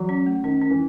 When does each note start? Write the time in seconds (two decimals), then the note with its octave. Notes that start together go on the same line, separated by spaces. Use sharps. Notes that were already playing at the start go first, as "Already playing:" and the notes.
Already playing: E3 F#3
0.09 C#4
0.26 A3
0.44 D#3 C#4
0.61 C#4
0.71 E3